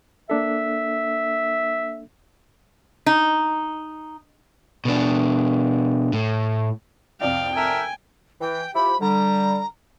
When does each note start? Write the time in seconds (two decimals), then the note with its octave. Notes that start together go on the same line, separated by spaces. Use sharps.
0.30 A#3 D4 A4 E5
3.06 D#4
4.85 B2 D4
6.13 A2
7.21 C2 F2 D5 F5 G5
7.56 A4 A#4 E5 G#5
8.41 E3 G5
8.75 F3 E4 G4 B5
9.01 D3 G3 A#5